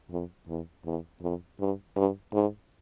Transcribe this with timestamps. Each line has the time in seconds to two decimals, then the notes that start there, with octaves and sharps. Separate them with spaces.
0.11 F2
0.48 E2
0.85 E2
1.22 F2
1.60 G2
1.96 G2
2.33 G#2